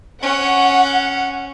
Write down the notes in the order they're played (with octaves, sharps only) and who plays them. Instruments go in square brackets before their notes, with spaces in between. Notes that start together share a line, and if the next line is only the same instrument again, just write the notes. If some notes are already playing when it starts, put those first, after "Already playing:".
[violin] C#4 [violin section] F#5